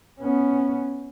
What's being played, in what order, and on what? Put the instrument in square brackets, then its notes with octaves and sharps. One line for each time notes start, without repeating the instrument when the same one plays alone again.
[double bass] B3 C#4